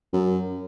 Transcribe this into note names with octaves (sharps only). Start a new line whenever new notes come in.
F#2